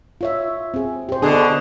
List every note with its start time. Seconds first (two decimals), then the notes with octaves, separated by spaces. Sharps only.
0.21 F4 C#5 E5
0.74 C4 G#4
1.09 G4 C5
1.22 B2 D3 B3 D4 G#4